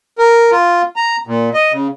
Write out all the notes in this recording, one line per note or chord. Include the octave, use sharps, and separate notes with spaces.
A#4
F4
A#5
A#2
D#5
C#3